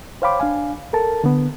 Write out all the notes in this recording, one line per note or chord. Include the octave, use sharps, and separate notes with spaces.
C5 C#5 F5 G5 B5 D6
D4 F5 G#5
A4 A#4 A5
D3 B3